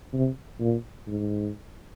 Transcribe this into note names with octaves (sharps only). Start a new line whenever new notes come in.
C3
A#2
G#2